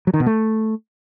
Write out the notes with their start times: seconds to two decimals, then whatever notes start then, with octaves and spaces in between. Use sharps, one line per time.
0.07 F#3
0.14 D#3
0.20 B2
0.26 A3